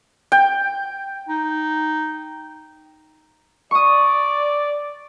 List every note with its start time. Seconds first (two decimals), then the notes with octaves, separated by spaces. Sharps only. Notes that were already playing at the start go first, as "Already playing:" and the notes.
0.32 G5
1.29 D#4
3.71 D5 C#6 D#6